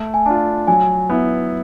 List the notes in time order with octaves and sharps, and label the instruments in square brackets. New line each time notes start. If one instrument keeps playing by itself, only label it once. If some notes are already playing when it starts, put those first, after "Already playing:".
Already playing: [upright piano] A3
[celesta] G#5
[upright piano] D4 F4 [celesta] A5
[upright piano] F#3 [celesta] G#5
[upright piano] B3 E4